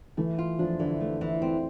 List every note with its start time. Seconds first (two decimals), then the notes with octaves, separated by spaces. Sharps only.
0.17 E3 A3
0.38 F4
0.59 F3 D4
0.79 D3 E3
1.00 A3
1.21 E3
1.42 C4